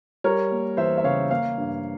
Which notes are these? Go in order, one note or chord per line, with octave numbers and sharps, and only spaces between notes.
G3 A#4 C#5
A#3
E2 C5 E5
E5
C#3 C#5 F5
A#3 C#5 F5
G2